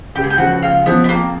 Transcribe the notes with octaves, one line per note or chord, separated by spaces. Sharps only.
C#2 G4
G#4
G4
C#3 F3 F#4
C#2 F4
C#3 F3 B3
B3
F2 A#3